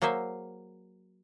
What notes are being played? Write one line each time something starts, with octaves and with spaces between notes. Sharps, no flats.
F#3 A#3 G#4 C5 E5